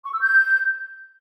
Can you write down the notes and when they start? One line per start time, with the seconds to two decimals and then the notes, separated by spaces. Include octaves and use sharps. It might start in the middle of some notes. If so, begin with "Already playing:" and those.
0.03 C#6
0.13 E6
0.23 G6